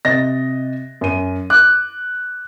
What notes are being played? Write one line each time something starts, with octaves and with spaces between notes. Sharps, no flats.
C3 D#5 A6 A#6
F#2 D#7
D6 F#6